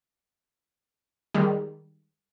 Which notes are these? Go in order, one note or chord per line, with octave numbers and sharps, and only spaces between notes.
D#3 G3 G#3